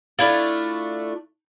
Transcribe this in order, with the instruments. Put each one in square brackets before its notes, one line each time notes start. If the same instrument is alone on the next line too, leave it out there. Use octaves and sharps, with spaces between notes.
[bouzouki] A3 D4 E4 F4